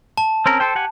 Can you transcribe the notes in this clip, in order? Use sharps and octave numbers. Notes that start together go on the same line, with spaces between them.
A5
C4 C#4 A#4
A4 C5 G5
G4 F#5 G#5